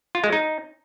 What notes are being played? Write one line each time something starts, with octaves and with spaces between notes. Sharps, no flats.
F4
G#3
D#4